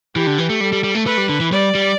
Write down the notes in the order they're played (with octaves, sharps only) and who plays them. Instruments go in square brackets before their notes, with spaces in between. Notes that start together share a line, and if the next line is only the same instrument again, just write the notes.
[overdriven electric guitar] E3 [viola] G4
[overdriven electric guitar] D3
E3
A3
[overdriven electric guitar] G3 [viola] A4
[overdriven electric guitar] G3
G3
A3
[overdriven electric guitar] A3 [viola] B4
[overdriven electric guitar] G3
D3
E3
[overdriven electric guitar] G3 [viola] D5
[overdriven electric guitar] G3